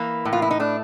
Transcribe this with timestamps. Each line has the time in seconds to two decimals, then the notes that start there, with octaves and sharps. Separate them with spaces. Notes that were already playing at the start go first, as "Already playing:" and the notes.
Already playing: E3 A#3
0.25 A2
0.33 F4
0.42 E4
0.51 D#4
0.60 A3 D4